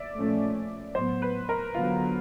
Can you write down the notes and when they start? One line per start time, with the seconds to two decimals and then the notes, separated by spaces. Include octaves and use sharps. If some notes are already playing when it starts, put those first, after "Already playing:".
Already playing: D5 E5
0.16 A#2 F3 A3 C#4
0.95 A2 F#3 B3 C5
1.22 B4
1.49 A#4
1.75 D3 F#3 B3 F4